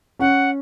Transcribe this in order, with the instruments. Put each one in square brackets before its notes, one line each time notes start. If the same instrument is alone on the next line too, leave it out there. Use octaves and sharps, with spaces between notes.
[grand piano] C#4 [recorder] F#5